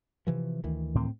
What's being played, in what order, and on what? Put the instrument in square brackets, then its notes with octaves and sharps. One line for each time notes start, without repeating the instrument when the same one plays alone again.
[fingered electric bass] C3 E3 F3
D2 D#3 E3
[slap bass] A2 C4